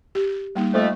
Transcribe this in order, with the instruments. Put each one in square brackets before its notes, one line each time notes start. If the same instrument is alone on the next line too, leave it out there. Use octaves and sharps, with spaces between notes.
[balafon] G4
G3 A#3 D#4
[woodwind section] F2 A3